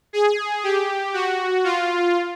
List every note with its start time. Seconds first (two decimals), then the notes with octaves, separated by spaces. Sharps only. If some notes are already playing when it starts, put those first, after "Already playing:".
0.13 G#4
0.63 G4
1.14 F#4
1.64 F4